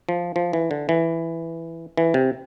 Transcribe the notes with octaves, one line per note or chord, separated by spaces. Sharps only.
F3
F3
E3
D3
E3
E3
C3